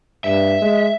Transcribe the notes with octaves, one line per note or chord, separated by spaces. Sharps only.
G2 E5
G#3